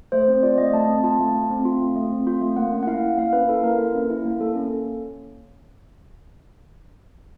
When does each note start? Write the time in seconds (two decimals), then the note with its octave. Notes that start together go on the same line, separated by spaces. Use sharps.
0.12 A3 C5
0.28 C4
0.43 F4 D5
0.58 A3 D#5
0.73 A3 A5
0.88 C4
1.04 F4 A5
1.19 A3
1.35 A3
1.50 C4
1.65 F4
1.80 A3
1.96 A3
2.10 C4
2.27 F4
2.41 A3
2.56 A#3 F#5
2.72 C#4
2.83 F#5
2.87 E4 F5
3.02 A#3
3.18 A#3 F5
3.33 C#4 B4
3.49 E4 A4
3.63 A#3 A#4
3.78 A#3
3.95 C#4
4.10 E4
4.25 A#3
4.40 A#3 A4
4.56 C#4